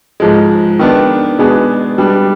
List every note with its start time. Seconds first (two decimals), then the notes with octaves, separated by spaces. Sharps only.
0.20 G#2 F3 G#3
0.79 D#3 B3 D4
1.38 B2 G#3 B3 D4 G#4
1.98 G3 B3 D4